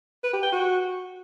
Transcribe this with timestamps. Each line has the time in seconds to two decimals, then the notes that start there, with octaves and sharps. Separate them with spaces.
0.24 B4
0.33 G4
0.43 G5
0.52 F#4